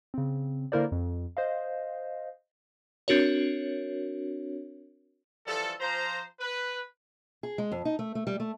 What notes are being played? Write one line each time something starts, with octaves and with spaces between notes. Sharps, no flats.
C#3 C4
D3 A#3 E4 A#4 C5 D5
F2
C5 D#5 F5
C4 D4 F#4 A#4 C#5
E3 F3 G3 A4
F3 C5 A#5
B4
G#4
G#3
F2
D#4
A3
A3
G3
A3